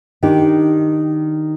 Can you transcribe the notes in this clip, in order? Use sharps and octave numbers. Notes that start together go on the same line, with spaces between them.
D#3 D4 D#4 G4